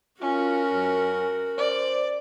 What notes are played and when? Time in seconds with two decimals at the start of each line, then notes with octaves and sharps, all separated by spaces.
0.21 C#4 F4 F#4 A#4
0.73 F#2
1.58 C5 D5